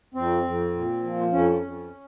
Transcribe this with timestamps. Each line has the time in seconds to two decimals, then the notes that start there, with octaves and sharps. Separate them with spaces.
0.14 F2 C4
0.43 F2
0.73 A#2
1.03 F3
1.32 F2 C#4
1.62 F2